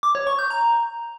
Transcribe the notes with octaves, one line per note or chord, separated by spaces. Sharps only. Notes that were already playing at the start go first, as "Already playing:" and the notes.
D6
C#5
C#6
G6
A#5